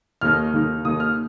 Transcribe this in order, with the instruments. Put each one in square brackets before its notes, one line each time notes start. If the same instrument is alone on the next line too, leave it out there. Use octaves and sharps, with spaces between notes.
[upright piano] D#2 D#3 A#3 D#4 F6
D#2 D#3 A#3 D#4
D#2 D#3 A#3 D#4 D#6
F6